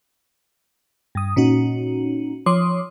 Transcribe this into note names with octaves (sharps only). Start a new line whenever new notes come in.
G2 D#6
A#2 C#4 D#4 F#4
F3 C#5 C6 D6 D#6